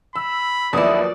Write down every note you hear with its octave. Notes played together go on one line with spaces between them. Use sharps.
B5 E6
D#2 F3 F#3 G#3 B3 E4 D5 D#6